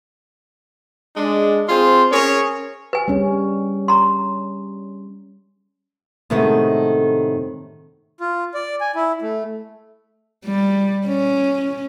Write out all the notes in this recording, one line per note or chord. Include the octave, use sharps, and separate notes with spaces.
G#3 D4
C4 F4 G#4 C5
C#4 G#4 A#4 C#5
B4 G#5
G3 C#4
A#5 C6
A2 C3 D#3 G#3 A3 B3
F4
D5
G#5
E4
A3
G3
C#4